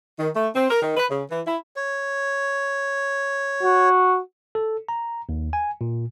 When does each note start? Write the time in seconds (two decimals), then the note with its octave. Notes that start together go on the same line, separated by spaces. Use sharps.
0.19 D#3
0.36 A3
0.55 C4
0.70 A#4
0.82 D#3
0.97 B4
1.10 C#3
1.31 E3
1.47 E4
1.76 C#5
3.63 F#4
4.55 A4
4.89 A#5
5.29 D#2
5.53 G#5
5.81 A#2